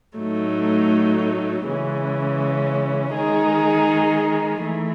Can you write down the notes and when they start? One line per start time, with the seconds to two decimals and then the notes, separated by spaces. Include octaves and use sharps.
0.18 A2 F#3 A3 D#4
1.66 C#3 E3 G#3 C#4
3.14 D#3 G#3 D#4 G#4
4.63 E3 A3